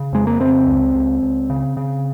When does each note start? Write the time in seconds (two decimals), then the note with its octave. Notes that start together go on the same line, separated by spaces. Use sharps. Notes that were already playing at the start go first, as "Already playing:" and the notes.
Already playing: C#3
0.13 F2 G#3
0.27 A#3
0.40 C#3 C4
0.67 C#2
0.95 C#2
1.22 C#2
1.50 C#3
1.77 C#3